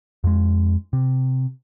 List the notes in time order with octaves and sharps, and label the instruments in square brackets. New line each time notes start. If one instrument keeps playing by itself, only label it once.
[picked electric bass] F2 G#3
C3